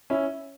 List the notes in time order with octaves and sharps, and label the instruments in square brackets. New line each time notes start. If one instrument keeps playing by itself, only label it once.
[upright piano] C#4 E4